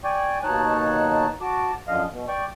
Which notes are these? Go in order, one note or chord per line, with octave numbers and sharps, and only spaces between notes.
D5 G5 G#5 C#6
D#2 B2 D#4 C#5 A5 F#6
F#4 A5 D6
F#2 D3 F3 D#5 F5
B2
D5 G5 C#6